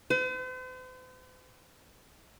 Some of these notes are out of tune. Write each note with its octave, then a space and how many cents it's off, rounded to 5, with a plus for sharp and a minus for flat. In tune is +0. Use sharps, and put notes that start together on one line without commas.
C5 -45